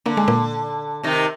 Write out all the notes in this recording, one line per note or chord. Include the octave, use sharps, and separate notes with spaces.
D3 A#3
G#3
A#2 A#3
C3 D#3